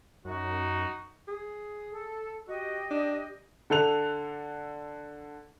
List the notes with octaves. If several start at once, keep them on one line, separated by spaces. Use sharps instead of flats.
F#2 D#4 F#4
G#4
A4
F#4 G4 D#5
D4
D3 A4 F#6 F7